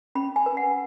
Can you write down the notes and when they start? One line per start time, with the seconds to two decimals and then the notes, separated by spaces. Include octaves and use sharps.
0.15 C#4 B5
0.36 G#5
0.46 B4
0.57 F#5